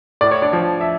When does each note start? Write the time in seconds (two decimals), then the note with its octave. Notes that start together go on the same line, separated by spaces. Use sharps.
0.21 A2 D5
0.31 C#5
0.42 D4 D5
0.53 F3
0.81 E5